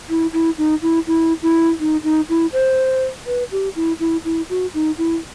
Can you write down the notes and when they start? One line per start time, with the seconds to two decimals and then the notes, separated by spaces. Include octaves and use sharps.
0.09 E4
0.33 E4
0.58 D#4
0.82 E4
1.07 E4
1.43 E4
1.80 D#4
2.04 D#4
2.29 E4
2.53 C5
3.27 B4
3.52 G4
3.76 E4
4.00 E4
4.25 E4
4.50 F#4
4.74 D#4
4.98 E4